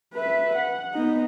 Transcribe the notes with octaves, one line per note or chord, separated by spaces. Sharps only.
B4 E5
F#5
B3 D#4